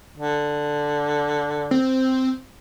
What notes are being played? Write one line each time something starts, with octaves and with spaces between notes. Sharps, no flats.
D3
C4